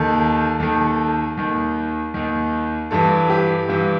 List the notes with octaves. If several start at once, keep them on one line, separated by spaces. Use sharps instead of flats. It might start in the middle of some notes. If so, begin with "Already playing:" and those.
Already playing: D#2 D#3 A4
D#2 D#3 A4
A4
D#2 D#3
D#2 D#3
G2 E3 A4
G4
G2 E3